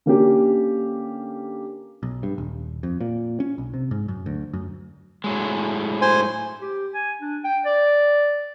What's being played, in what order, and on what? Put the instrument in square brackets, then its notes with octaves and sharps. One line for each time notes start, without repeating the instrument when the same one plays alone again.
[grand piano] D3 A#3 C#4 G4
[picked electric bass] B1
G2
D#1
F2
A#2
C#4
B1
C3
G#2
F#2
D2
F#2
[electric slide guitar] A2 F#3 G#3
[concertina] C5 G#5 C6
[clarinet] G4
G#5
D4
G5
D5